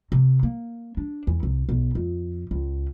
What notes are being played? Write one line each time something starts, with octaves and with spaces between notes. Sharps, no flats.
C3
A#3
D4
E2
C2
B1
F2
C#2